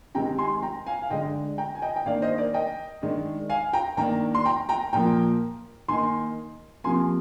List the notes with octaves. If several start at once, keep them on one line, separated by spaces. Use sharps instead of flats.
C3 D#3 G#3 C4 G5 A#5
G#5 C6
G5 A#5
F5 G#5
F5
D3 G#3 D4 D#5 G5
G5 A#5
G#5
D#5 G5
G5
D#3 A#3 D4 D5 F5
C5 D#5
A#4 D5
D#5 G5
D#3 G#3 D4
F5 G#5
G5 A#5
D#3 A#3 D4 G5 A#5
C6
G5 A#5
G5 A#5
A#2 F3 A#3 G5 A#5
D#3 A#3 D#4 G#5 C6
C3 F3 A#3 G#5 C6